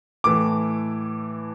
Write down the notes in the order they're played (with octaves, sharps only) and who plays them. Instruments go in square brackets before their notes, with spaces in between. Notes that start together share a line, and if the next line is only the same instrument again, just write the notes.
[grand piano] A2 E3 A3 D6